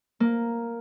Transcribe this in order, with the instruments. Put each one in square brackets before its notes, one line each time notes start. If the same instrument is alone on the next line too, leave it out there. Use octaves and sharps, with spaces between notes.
[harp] A#3